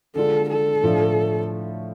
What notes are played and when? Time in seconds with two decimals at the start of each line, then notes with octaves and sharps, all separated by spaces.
0.16 D3 G#3 D4 F4 A4
0.50 A4
0.83 A2 F3 A3 D4